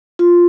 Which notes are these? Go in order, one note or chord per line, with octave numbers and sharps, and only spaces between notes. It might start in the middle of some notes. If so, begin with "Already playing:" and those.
F4